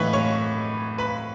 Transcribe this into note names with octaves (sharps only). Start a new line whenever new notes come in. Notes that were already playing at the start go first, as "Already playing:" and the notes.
Already playing: A2 E3 B4 B5 C#6
C#5 C#6
B4 B5